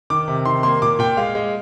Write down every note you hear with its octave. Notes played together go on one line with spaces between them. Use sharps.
D#3 D6
C3
D#3 C6
A#3 C6
A#2 D6
A#2 G5
G#3 F5
G#3